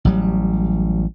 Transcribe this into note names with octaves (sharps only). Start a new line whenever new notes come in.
A1 F#3 G3